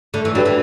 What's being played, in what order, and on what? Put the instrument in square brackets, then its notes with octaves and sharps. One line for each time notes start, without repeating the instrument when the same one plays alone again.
[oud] D3 [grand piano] A3
[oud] E3
[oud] F#3 [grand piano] D4 G4 B4
[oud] E3